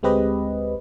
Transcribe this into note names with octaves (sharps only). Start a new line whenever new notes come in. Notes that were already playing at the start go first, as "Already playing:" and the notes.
D2 G#3 C4 G4 B4 D#5